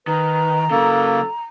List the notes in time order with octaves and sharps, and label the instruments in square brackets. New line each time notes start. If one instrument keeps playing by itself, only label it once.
[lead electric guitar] D#3 [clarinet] B4 [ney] A#5
[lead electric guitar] C#3 F#3 [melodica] A#3 [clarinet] A4